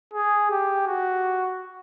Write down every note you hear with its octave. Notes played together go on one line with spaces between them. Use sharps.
G#4
G4
F#4